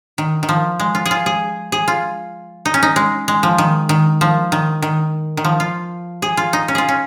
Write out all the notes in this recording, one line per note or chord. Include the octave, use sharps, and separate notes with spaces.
D#3
D#3
F3
G#3
F4
G#4
F4
G#4
G#4
F4
D#4
C#4
D#4
G#3
G#3
F3
D#3
D#3
F3
D#3
D#3
D#3
F3
F4
G#4
F4
D#4
C#4
F4 G#4
C#4